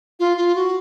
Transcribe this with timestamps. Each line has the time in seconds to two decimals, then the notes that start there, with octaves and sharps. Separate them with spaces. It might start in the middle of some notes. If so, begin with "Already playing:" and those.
0.19 F4
0.37 F4
0.55 F#4